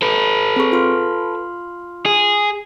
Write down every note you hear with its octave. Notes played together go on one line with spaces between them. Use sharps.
A4 B4
C4 G#4 C#6
F4 C6 F6
G#4